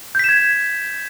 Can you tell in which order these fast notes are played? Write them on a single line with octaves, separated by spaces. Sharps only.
G6 B6 E7 G#6